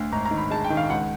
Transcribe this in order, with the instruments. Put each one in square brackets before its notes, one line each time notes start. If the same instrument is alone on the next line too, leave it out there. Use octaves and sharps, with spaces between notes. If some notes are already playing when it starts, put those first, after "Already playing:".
Already playing: [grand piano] D2
G#1 A#5
A#5
D#3
B5
G#3 A5
G5
D#3
F5
C#2 F#5